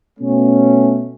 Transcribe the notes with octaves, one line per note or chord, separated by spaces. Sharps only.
B2 A3 C#4